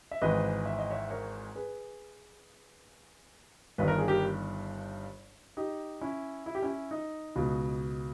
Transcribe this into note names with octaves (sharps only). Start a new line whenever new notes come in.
E5
G#1 G#2 E3 B4 D#5
E5
D#5
C#5 E5
A#4 C#5
G#4 B4
G1 G2 D#3 B4
A#4
G#4
G4 A#4
D#4 G4
C#4 E4
E4
G4
C#4 E4
D#4
C#2 B2